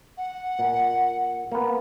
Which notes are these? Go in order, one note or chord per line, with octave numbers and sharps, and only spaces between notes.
F#5
A#2
A#3 B3